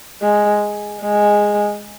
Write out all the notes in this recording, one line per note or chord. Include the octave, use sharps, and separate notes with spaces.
G#3
G#3